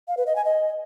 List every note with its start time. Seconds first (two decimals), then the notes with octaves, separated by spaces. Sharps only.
0.08 F5
0.17 B4
0.26 D#5
0.36 G#5
0.45 D#5